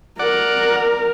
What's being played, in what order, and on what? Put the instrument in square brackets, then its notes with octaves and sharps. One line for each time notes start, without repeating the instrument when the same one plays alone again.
[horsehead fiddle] A#4 [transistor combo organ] D5 F#5